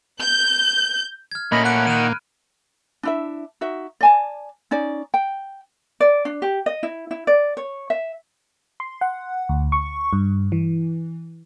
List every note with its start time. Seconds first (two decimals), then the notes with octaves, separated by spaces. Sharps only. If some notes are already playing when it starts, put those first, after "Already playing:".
0.21 G6
1.31 F6 G#6
1.52 A#2 A3 A#3 C#4 D#5 B5
1.65 F#5 B5 F#6 D7
1.87 D#3 F6 D#7
3.03 D4 E4 E5
3.61 D#4 F#4 E5
4.01 D5 G#5 A5
4.71 C#4 D#4 D5
5.14 G5
6.00 D5
6.25 D4
6.42 G4
6.66 D#5
6.83 E4
7.11 E4
7.27 D5
7.57 C#5
7.90 E5
8.80 C6
9.01 F#5
9.49 D2
9.72 C#6
10.13 G2
10.52 E3